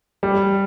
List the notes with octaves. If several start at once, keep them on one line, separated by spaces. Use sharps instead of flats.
G3